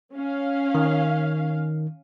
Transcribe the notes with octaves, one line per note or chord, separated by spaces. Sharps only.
C#4 F5
D#3